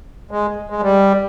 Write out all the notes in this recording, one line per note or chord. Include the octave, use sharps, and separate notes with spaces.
G#3
G#3
G3